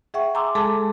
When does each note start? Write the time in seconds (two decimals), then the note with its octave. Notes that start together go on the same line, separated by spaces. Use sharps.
0.14 G#4 E5 F#5 G5 C#6
0.35 G#5 A#5 C6 D6 E6
0.55 G#3 G#4 A4 A5 D6